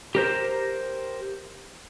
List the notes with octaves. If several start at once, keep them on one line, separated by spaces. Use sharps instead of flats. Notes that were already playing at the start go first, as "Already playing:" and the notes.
G4 A#4 C5